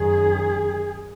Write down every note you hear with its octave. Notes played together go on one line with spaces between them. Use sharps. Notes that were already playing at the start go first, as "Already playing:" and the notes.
Already playing: F#2 D#3 G#4